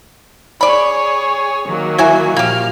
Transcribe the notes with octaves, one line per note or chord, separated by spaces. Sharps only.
G#4 C#5 D5 B5
D#3 F#3 A#3
E4 F#4 G#5
A#2 F3 A#3 G4 F6